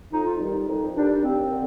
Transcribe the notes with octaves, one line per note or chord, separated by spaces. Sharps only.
F2 D#4
F4
D#3 G3
D#4
F2 D#4
D#3 G3 D4
D4
D#2 C4
D3